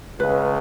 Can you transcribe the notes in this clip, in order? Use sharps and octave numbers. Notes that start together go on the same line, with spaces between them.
C#2 C#3 B4